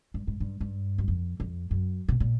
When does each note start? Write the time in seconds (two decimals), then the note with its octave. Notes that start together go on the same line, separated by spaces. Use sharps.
0.14 G2
0.27 G#2
0.40 G2
0.60 G2
0.98 F#2
1.08 F2
1.40 F2
1.71 F#2
2.08 B2
2.20 A#2